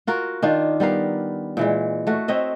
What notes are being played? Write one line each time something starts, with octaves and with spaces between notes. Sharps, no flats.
F4 F#4 A#4
D#3 D4 F4
G3 B3 A#4 F5
A#2 E3 G#3
A3 F#4
C4 C#5 D#5 E5